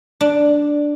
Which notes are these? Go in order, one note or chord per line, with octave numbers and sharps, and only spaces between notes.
D4